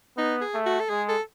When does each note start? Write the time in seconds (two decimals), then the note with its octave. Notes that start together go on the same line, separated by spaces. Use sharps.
0.17 B3 D#4
0.41 G#4
0.54 A3
0.66 F#4
0.80 A4
0.90 G#3 G#4
1.09 A4